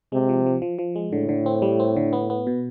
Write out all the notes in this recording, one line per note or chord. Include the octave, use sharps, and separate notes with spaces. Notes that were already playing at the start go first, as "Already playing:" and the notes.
C3 G#3
F3
F3
F3
F3
G#3
A2 D3
D3
C4
G3
C4
D3
B3
B3
B2